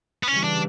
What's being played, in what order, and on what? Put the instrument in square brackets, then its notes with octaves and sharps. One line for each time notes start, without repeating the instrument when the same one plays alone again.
[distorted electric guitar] B3
[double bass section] C#3 E3 G3 [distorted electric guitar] C#4
[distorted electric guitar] D4